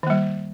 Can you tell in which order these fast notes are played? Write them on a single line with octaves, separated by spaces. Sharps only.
D#3 A#3 G3